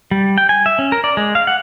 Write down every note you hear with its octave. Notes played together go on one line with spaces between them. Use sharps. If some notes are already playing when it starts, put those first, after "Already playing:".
G3
G5
G#5
E5
C#4
A#4
D5
G#3
F5
F#5